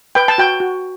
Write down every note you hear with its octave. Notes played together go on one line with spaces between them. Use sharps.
B4 G5
A5
F#4 G5
F#4